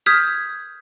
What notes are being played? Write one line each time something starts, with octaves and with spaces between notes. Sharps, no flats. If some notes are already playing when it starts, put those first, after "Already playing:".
D#6 F6 G6 G#6 B6